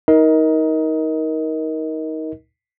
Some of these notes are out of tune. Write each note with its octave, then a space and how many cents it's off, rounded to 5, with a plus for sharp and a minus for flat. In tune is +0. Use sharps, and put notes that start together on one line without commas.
D#4 +25 A#4 +15 D#5 +25